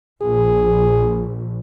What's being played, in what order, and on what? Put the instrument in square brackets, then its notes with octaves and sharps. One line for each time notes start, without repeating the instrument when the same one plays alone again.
[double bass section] A#1 [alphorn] G#4